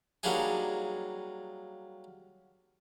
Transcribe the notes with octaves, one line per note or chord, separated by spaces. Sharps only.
F#3 G3 A#3 D4 D#4 G#4